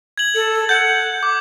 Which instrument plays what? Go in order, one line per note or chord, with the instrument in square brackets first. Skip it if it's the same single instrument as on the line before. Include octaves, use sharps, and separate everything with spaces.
[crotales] G#6 F#7
[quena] A4
[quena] F#5 [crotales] G6
[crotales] D6